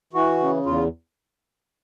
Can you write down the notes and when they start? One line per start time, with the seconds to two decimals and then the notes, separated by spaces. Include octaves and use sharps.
0.13 E3 F#4
0.39 C#3
0.66 E2 F4